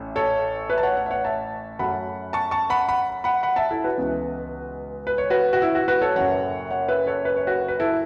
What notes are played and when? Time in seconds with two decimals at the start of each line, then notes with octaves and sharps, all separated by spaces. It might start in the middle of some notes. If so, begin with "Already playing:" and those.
Already playing: A1 A2 A3 C#4
0.16 A4 C#5
0.70 B4 E5
0.78 A5
0.83 C#5 F#5
0.97 C#5 F#5
1.06 E5
1.11 C#5 F#5
1.25 E5 A5
1.79 F#2 F#3 A3 C#4 F#5 B5
2.33 A5 C#6
2.51 A5 C#6
2.70 F#5 B5
2.88 F#5 B5
3.24 F#5 B5
3.43 F#5 B5
3.56 E5 A5
3.71 E4 A4
3.84 F#4 B4
3.98 C#2 C#3 E3 B3
5.07 B4
5.18 C#5
5.30 F#4 B4
5.53 F#4
5.62 E4
5.75 F#4
5.88 F#4 B4
6.02 A4 C#5
6.16 F#1 F#2 F#3 C#5 F#5
6.71 C#5 F#5
6.89 B4 E5
7.06 A4 C#5
7.25 B4
7.36 C#5
7.47 F#4 B4
7.68 B4
7.80 E4 A4